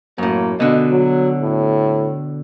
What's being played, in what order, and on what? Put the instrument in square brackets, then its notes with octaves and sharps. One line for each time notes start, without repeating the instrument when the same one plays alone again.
[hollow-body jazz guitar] F#2 A2 [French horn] A#3
[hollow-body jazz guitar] B2 D3 [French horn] D#5
[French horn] F#3
A2